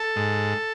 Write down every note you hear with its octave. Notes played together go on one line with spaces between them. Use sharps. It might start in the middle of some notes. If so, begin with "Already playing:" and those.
Already playing: A4
G#2